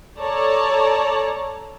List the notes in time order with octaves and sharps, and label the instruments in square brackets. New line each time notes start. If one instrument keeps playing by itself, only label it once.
[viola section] A4 C#5 D5 A5 A#5